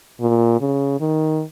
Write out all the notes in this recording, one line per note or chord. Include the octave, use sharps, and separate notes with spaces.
A#2
C#3
D#3